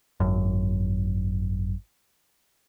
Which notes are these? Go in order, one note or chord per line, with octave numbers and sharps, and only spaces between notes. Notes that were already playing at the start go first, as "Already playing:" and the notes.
G#1 F#2